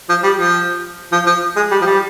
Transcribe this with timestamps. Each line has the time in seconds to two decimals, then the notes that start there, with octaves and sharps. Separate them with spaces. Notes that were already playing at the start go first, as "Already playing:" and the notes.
0.09 F3
0.23 G3
0.39 F3
1.12 F3
1.27 F3
1.56 G#3
1.71 G3
1.82 F3
1.86 G3